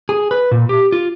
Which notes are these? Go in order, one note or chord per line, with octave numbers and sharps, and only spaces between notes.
G#4
B4
A#2
G4
F4